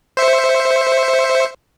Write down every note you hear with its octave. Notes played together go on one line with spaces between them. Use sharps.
C5 E5 C#7